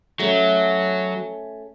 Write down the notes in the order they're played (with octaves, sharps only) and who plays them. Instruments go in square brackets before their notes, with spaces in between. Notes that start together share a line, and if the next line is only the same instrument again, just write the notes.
[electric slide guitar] F#3 [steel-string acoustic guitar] A3 C#4